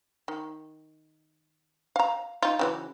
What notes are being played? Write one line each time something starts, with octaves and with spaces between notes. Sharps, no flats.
D#3
F5 A#5
D#4 F4
C#3 E3 F#3